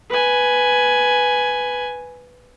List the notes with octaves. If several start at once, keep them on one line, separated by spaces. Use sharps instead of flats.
B4 G#5